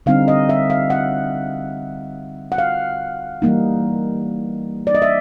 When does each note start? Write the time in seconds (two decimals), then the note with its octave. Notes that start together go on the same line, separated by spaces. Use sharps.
0.06 D3 G3 C4 D#4 F5
0.28 D#5
0.49 E5
0.70 F5
0.90 F#5
2.52 F#5
2.58 F5
3.42 E3 G3 A#3 D#4
4.87 D5
4.95 D#5
5.02 E5